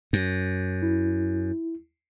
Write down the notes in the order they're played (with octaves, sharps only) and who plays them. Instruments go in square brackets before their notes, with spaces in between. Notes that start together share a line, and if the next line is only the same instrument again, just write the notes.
[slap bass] F#2
[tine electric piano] E4